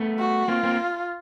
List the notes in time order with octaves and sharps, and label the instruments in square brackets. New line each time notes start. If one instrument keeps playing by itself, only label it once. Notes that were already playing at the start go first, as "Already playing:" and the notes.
Already playing: [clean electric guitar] A3 B3
[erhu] F#4
[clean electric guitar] A#3 C4 [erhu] F4
[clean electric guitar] A#3 C4